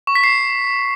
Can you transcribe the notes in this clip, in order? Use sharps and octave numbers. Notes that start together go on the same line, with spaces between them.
C#6
B6
C7